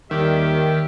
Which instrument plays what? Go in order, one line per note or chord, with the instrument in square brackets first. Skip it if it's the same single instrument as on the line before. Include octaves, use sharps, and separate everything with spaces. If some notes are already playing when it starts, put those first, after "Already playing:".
[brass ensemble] D#2 G3 [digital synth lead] D#3 [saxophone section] G4 E5